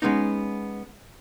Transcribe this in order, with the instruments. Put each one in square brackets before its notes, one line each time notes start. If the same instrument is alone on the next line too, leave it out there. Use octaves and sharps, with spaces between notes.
[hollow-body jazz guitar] G#3 B3 C#4 D#4